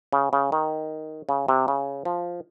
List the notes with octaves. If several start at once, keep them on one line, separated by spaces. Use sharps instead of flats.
C#3
C#3
D#3
C#3
C3
C#3
F3